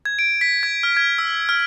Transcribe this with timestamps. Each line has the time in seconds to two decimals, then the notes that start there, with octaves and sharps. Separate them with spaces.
0.05 G#6
0.19 D7
0.41 B6
0.63 G#6
0.83 F6
0.97 G#6
1.18 E6
1.49 F6